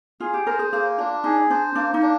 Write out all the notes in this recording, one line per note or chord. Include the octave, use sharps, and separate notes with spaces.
F4 G#4
G4
A#4 C5
G#4
A#3 G#4
D4 F4
D#4 G#4
D4 C5
A#3 D4
D#4
D4